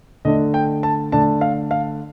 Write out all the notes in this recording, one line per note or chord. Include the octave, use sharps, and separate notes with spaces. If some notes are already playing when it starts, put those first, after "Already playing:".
D3 A3 D4 D#5
G5
A5
D3 A3 D4 A5
F5
F5